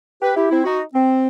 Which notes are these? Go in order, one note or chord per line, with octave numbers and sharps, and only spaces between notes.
G4 B4
E4 G4
C4 E4
D#4 F#4
C4